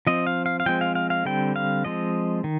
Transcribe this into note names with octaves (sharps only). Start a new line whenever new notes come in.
F3 C4 D#5
F5
F5
F5
F3 G#3 C4 G5
F5
F5
F5
D3 G3 C4 G5
F5
F3 G#3 C4 D#5
D#3